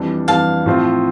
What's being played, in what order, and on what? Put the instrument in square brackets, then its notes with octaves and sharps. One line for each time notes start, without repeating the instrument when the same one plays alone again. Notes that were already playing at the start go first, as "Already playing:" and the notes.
Already playing: [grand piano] F2 E3 G3 D4
[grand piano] F2 E3 G3 D4 [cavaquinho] F5 A5
[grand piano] A2 F3 C4 F4